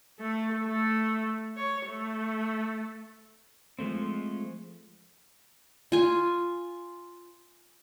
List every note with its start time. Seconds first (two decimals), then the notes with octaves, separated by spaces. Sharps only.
0.20 A3
0.66 A3
1.56 C#5
1.87 A3
3.79 F3 G#3 A3 C4
5.92 F4 G#5